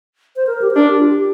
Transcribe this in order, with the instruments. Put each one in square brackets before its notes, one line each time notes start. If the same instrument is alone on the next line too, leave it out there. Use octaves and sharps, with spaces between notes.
[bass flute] C5
A#4
G4
C5
[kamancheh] D4 [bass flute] A#4
[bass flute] G4
F4
G4